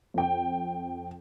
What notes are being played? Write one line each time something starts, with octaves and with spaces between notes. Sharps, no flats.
F2 G5